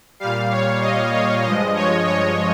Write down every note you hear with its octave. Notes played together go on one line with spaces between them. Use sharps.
A#2 G3 F5
C#5
D#5
C#5
G2 F3 G#3 D#5
C#5
C#5